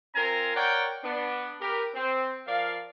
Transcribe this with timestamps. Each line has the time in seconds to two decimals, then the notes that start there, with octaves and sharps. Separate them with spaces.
0.15 C4 F4 A#4 G#5 A#5
0.56 A#4 C#5 D5 F#5 G5
1.04 B3 D4
1.61 G4 A#4 B4
1.95 C4
2.47 F3 A#4 D5 F5